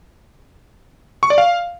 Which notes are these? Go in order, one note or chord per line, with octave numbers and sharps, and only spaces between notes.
C#6
D5
F5